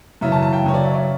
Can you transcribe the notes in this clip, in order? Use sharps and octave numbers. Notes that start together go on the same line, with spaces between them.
F#2 C#3 E3 E5
A5
A5
G5
F#2 C#3 F#3 C#5
D5
E5
C#5
D5